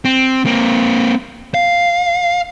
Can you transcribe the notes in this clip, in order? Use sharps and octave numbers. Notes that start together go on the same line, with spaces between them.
C4
A#3 C4
F5